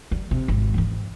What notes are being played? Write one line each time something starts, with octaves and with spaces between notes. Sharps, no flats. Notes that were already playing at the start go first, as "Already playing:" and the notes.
G3
C3
G#1
G#2 E3